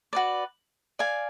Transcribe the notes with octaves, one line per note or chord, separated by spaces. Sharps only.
F#4 B4 D5
D5 F5 G#5